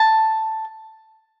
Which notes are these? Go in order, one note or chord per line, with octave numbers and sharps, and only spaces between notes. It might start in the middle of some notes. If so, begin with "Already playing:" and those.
Already playing: A5